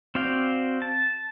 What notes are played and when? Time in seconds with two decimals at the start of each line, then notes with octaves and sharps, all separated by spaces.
0.15 C4 F#4 D5 F5 G5
0.82 A5